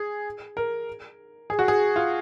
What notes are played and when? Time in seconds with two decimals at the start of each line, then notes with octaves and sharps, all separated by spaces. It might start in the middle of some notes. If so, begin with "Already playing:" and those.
Already playing: G#4
0.57 A#4
1.50 G#4
1.59 F#4
1.68 G#4
1.96 F4